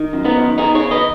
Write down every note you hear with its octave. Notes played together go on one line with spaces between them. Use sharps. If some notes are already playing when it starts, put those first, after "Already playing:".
Already playing: D#3
F#2
B3 D#4
D#3
B3 D#4 G#4
G#4 C#5
D#3
B4 D#5